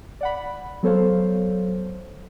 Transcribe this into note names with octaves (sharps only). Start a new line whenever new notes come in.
D5 F#5 B5
F#3 B3 A4 C5 C#5 F5